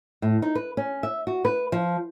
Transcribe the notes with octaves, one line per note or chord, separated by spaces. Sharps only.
A2
D#4
B4
C#4
E5
F#4
B4
F3